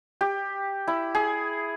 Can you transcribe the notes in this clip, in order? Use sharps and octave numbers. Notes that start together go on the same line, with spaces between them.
G4
E4
G#4